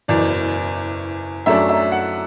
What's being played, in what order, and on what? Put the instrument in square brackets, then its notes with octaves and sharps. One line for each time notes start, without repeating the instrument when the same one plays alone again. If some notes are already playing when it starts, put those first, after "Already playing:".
[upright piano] F#1 E2 B2 D5
F#2 F#3 A3 D4 E5
E5
F#5